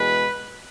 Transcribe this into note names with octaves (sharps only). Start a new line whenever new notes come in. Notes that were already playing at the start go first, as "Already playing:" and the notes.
Already playing: E2 B2 G#3 B4